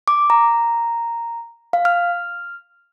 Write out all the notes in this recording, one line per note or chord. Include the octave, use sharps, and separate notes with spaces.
D6
A#5
F5
F6